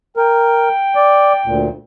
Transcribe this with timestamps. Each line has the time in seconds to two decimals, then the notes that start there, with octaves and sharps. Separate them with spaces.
0.17 A#4 G5
0.95 D5
1.46 D2 A#2